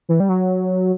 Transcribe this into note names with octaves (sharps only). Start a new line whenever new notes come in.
E3
G3
F#3